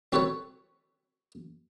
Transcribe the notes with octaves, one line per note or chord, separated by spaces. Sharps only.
C4 F#4 G4 A4 B4 C#5